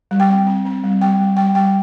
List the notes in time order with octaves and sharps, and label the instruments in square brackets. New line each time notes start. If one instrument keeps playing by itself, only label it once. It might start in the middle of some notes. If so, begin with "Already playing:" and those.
[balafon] G3
G5
C4
C4
C4
G3
G3 G5
G3
G3 G5
G3 G5